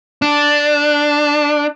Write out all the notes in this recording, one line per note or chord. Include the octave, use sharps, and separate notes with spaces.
D4